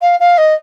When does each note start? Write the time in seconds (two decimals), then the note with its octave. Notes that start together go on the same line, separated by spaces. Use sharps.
0.01 F5
0.20 F5
0.37 D#5